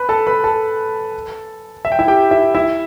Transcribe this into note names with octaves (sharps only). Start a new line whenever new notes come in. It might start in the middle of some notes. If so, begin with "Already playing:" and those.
Already playing: B4 B5
A4 A5
B4 B5
A4 A5
E5
G5
E4 E5
G4 G5
E4 E5
E4 E5